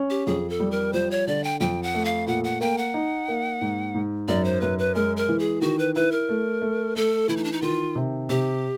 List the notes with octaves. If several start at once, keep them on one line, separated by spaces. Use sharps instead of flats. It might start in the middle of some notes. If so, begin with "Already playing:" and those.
Already playing: C#4
G4
F2 G#4
A4
G3
A#4
F3 C5
C#5
D3 D5
G5
F2 G5
F#5
A3
F5
A#2 F#5
F#5
A#3 G5
F#5
D#4
A#3
G#2
G#2
F#2 D5
C5
F#2 B4
B4
G#3 A#4
A#4
E3
G#4
D#3 F#4
B4
E4 B4
A#4
A3
A3
A3 A4
E3 E4
D#4
D4
D#4
D#3 F4
C3
C3 G4